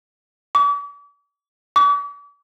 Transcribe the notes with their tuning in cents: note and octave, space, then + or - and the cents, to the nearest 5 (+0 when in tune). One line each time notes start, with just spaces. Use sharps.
D6 -40
D6 -40